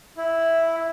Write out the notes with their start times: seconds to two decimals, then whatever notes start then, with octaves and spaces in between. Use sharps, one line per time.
0.17 E4